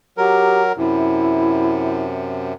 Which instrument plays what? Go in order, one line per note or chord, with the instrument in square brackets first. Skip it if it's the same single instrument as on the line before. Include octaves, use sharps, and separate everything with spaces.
[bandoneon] F#3 A#4 [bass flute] G4
[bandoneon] F#2 C3 [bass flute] E4